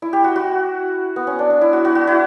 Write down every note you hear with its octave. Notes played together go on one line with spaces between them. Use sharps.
E4
G4
F#4
F#4
B3
C#4
D4
D4
E4
F#4
F#4
F#4
E4